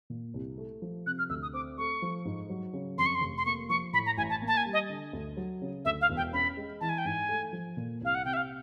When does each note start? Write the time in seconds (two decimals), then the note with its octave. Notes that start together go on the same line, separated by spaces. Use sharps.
0.10 A#2
0.34 C2
0.58 A3
0.82 F3
1.06 C3 F#6
1.19 F6
1.29 D2 E6
1.42 D#6
1.53 C4 D6
1.78 A3 C#6
2.02 F3
2.25 G#2
2.49 F#3
2.73 C#3
2.97 F2 C6
3.06 C#6
3.15 C6
3.21 F1
3.38 C6
3.46 A#3 C#6
3.69 F3 C#6
3.93 A2 B5
4.06 A#5
4.17 A1 G#5
4.30 A5
4.42 A#3
4.48 A5
4.57 G#5
4.66 G3
4.73 D#5
4.90 D3
5.13 D2
5.37 F#3
5.62 C#3
5.85 D2 E5
6.01 F5
6.09 E1
6.17 G5
6.33 C#4 B5
6.57 G#3
6.81 E3 A5
6.89 G#5
6.98 G5
7.05 G#2 G#5
7.29 A3
7.53 F3
7.77 A#2
8.01 C2 F5
8.15 F#5
8.25 C3 G5
8.33 E5
8.37 F5